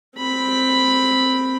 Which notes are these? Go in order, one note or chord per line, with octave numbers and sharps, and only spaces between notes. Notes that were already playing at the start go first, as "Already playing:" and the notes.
C4 B5